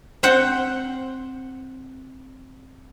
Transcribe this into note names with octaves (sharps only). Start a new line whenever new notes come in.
C4 C5 F#5 G5